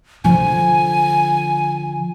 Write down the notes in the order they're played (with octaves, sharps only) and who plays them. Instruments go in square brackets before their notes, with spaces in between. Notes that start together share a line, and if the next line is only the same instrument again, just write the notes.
[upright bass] D3 F3 [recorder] G#5